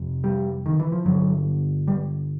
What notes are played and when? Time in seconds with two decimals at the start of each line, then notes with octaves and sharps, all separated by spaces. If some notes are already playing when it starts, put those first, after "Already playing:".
Already playing: F2 C3
0.24 G3
0.66 D#3
0.80 E3
0.92 F3
1.05 G2 D3 F#3
1.88 G3